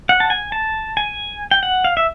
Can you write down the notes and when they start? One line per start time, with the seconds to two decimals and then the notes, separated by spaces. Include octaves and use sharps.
0.09 F#5
0.20 A5
0.30 G#5
0.52 A5
0.97 G#5
1.51 G5
1.63 F#5
1.84 F5
1.97 E5